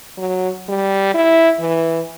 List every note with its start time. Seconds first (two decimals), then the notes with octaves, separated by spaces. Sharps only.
0.17 F#3
0.69 G3
1.14 E4
1.60 E3